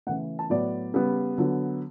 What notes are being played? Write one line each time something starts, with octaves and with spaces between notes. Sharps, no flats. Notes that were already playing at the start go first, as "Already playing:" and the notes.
C#3 E3 A3 F#5
A5
A2 F#3 B3 D5
C#3 G3 B3
D3 F#3 B3